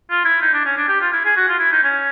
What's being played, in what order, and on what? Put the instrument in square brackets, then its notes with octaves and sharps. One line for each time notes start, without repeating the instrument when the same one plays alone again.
[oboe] F4
E4
D#4
D4
C#4
D4
G4
F4
E4
G#4
F#4
F4
E4
D#4
C#4